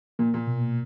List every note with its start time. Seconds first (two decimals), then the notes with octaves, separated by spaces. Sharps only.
0.19 A#2 A#3
0.34 A#2
0.47 B2